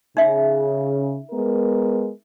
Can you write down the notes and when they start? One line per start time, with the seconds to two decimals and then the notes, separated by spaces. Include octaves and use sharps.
0.17 C#3 D#4 E5
1.31 G#3 B3 A#4